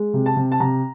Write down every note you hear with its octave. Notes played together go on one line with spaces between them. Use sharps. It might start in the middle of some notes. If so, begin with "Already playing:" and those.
Already playing: G#3
C3
A5
C3
A5
C3 A#5